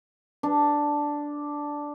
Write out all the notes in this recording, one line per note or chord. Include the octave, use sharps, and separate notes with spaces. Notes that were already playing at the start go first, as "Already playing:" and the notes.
D4